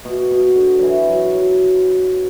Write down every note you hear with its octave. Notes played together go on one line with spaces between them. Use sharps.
B2
B2
D3
E3 F#3
F#3
F#3